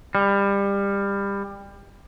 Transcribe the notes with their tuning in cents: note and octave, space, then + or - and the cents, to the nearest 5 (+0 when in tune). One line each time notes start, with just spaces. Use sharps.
G3 +25